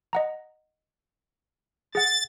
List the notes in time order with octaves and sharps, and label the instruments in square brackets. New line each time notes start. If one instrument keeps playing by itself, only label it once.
[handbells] D#5 F#5 A#5
[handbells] G#4 F#5 [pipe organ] A6